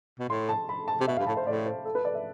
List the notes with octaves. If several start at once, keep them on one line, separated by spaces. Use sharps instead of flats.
B2
A2 C6
A5
B5
A5
C3
B2 E5
G2 F5
B5
A2 A5
C5
A2 D5
C5
A4
B4
D5
E5